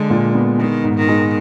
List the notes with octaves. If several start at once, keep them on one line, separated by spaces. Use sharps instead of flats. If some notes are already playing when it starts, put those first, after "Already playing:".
Already playing: D3 G#3
A#2
B3
D#3 G#3
G#2
D#3
G#3